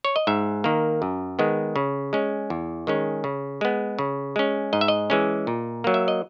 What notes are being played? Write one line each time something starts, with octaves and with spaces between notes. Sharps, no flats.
C#5
D#5
G#2 E5
D#3 A#3
F#2
D#3 G#3 B3
C#3
G#3 C#4
E2
D#3 G#3 C#4
C#3
G#3 B3
C#3
G#3 C#4
G#2 D#5
E5
D#5
E3 G#3 C#4
A#2
F#3 A#3
E5
D#5